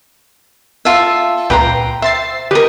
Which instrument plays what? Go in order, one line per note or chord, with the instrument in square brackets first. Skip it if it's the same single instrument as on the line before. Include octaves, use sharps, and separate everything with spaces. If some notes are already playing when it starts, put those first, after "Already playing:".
[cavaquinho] F4 A4 E5
[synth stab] C#2 A#2 B4 [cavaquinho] G5 A#5 C6
[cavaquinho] C5 [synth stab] E5 A6 C7
[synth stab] D3 G4 B4 [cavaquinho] A#4 D#5